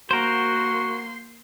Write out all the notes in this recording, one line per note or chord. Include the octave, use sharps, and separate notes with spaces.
A#3 F#4 A#4 C5 C6